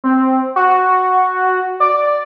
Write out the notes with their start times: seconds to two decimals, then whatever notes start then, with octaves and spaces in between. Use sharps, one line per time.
0.04 C4
0.56 F#4
1.80 D5